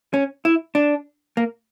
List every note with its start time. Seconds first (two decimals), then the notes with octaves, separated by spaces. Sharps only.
0.14 C#4
0.45 E4
0.75 D4
1.37 A#3